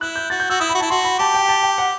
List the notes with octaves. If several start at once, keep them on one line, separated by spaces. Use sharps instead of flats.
E4 F#6
G6
F#4 A6
G6
F#4 E6
E4 D#6
B5
F#4
E4 A5
F#4 C6
B5
G4 A5
G5
A5
G5
F#5